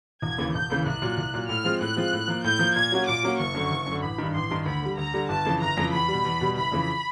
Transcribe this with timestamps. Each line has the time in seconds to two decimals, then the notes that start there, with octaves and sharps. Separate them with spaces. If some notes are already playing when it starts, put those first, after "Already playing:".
0.22 E1 G#6
0.38 D#2 C#3 E3
0.54 E1 G6
0.70 D#2 C#3 E3
0.86 C2 F#6
1.02 A#2 F#3
1.17 C2
1.34 A#2 F#3
1.49 A2 F6
1.64 F3 G#3 C4 F4
1.81 A2 F#6
1.97 F3 G#3 C4 F4
2.13 A2
2.28 F3 A#3
2.44 A2 G6
2.59 F3 A#3
2.75 A#2 G#6
2.92 F#3 A#3 C#4 F#4
3.07 A#2 D6
3.23 F#3 A#3 C#4 F#4
3.39 F#1 C#6
3.54 F#2 D3
3.71 F#1
3.86 F#2
3.91 D3
4.03 A1 B5
4.18 G2 D#3
4.34 A1 C6
4.50 G2 D#3
4.66 D2 B5
4.82 D3 G3
4.97 D2 A#5
5.14 D3 G3
5.29 G1 A5
5.45 F2 C#3 E3
5.61 G1 A#5
5.77 F2 C#3 E3
5.93 E2 B5
6.08 B2 G3
6.25 E2
6.41 B2 G3
6.56 F#1 B5
6.72 F2 C#3 E3